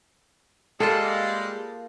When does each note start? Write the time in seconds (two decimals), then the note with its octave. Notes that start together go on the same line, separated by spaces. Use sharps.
0.80 G3 G#3 A#3 F4 A4 A5